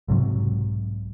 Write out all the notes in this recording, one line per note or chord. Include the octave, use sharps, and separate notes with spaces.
B1 G#2 C3 F#3